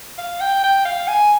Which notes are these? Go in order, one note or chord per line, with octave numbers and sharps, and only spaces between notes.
F5
G5
G5
F5
G#5